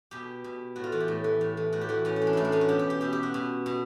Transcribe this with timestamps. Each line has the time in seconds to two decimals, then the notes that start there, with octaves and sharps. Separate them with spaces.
0.11 B2 G4
0.44 B2
0.76 A2 F#4
0.84 F4
0.92 E3 F#4
1.00 G4
1.08 A2
1.24 E3
1.41 A2
1.57 E3
1.72 A2 F#4
1.81 G4
1.89 E3 F#4
2.05 A2 C#4
2.16 C#4
2.22 E3
2.27 D4
2.33 A2 D#4 E4
2.45 D4
2.52 E3 C#4
2.61 F#4
2.69 B2 G4
2.79 G4
2.90 G4
3.01 B2 G4
3.13 G4
3.23 F#4
3.34 B2
3.66 B2